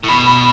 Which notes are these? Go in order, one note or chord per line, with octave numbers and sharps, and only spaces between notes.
A2
B2 B5
B5